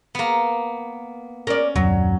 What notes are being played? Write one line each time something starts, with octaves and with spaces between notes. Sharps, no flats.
A#3 B3
C#4 A#4 D5
D#1 F#2 F#3